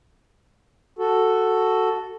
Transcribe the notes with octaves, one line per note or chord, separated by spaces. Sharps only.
F#4 A4